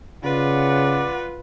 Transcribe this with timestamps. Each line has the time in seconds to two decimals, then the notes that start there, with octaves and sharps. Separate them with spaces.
0.24 C#3 F4 B4 D5 F#5